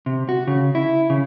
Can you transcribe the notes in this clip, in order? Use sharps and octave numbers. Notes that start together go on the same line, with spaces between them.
C3
F#4
C#3
E4
C#3